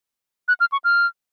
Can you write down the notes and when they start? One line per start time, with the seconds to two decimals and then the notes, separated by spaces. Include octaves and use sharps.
0.48 F#6
0.60 F6
0.72 C#6
0.84 F6